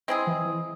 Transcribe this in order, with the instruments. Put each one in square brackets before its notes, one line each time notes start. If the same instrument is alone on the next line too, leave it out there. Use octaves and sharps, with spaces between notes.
[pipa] G#3 C4 E4 G#4
[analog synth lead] E3
E3